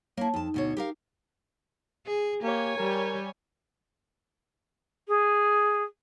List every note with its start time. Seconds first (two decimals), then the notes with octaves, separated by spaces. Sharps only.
0.17 A#3 E4 C#5 A5
0.34 F2 D#4 A5
0.54 D2 B2 C#5
0.77 G4 A#4 F5
2.06 G#4
2.43 A#3 G4 C#5 G#5
2.78 G3 G4 A#4
5.08 G#4